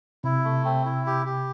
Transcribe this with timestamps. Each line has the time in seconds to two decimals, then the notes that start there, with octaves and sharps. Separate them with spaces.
0.24 C3 E4
0.44 A3
0.65 C4
0.85 E4
1.06 G4
1.26 G4